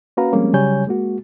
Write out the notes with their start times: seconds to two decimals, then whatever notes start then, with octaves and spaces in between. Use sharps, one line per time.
0.17 A#3 C#4 F#4 B4 F5 A#5
0.32 F3 G3 G#3 A#3 C4 C#4
0.54 C#3 F#3 G3 C#5 G#5 G6
0.87 G#3 A#3 F#4